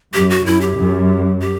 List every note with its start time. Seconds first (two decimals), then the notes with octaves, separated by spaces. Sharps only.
0.14 F#2 G4
0.30 F#4
0.45 F#2 E4
0.61 G4
0.77 F#2
1.41 G4